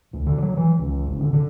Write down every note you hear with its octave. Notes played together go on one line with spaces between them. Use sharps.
D2
D3
F#3
E3
C#2
F#1
D3
D3